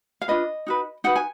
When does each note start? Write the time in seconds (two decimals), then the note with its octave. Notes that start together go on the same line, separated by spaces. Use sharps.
0.21 F5
0.28 D4 F4 B4 D#5
0.67 D#4 F#4 B4
1.04 D#4 F#4 B4 F#5
1.16 G#5